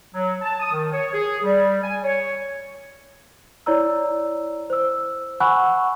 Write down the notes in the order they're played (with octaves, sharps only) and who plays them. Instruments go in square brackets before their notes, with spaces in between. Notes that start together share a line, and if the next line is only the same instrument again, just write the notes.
[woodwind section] F#3
A5
D#6
D#3
C#5
G#4
G3
G#5
C#5
[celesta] E4 C#5 D5 A#5 E6
C5 E6
F#5 G#5 B5 C#6 E6 F#6